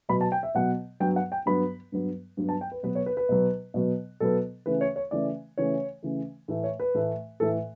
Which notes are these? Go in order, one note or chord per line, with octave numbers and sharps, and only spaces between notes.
B2 F#3 B3 B5
A5
G5
E5
B2 F#3 B3 F#5
G2 F#3 B3 G5
F#5
G5
G2 F#3 B3 B5
G2 F#3 B3
G2 F#3 B3
A5
G5
B4
B2 F#3 B3 B4
C#5
B4
B4
B2 F#3 B3
B2 F#3 B3
B2 F#3 B3 A4
C#3 E3 A3 B4
C#5
C#5
C#3 E3 A3 D5
C#3 E3 A3 C#5
C#3 E3 A3
A2 E3 A3
C#5
B4
A2 E3 A3
A2 E3 A3 A4